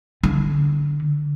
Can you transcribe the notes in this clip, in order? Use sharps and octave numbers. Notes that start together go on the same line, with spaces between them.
D3